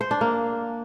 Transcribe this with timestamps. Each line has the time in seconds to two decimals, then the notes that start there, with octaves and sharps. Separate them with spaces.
0.01 C5
0.11 D4
0.21 A#3